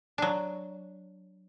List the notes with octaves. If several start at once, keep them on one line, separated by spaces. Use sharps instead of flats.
F#3 D4